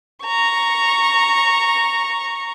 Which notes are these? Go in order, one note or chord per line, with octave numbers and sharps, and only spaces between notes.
A#5 C#6